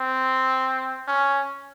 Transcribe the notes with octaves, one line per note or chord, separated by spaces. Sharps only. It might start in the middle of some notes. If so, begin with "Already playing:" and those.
Already playing: C4
C#4